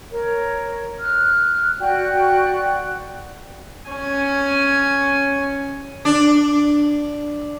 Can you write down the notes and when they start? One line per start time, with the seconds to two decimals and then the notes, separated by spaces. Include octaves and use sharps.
0.11 A#4 C#5
0.99 F6 F#6
1.80 F#4 D5 G5 F#6
3.89 C#4 G#5
6.05 D4